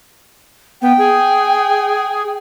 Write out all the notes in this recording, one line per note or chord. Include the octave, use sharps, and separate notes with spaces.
B3 G5
G#4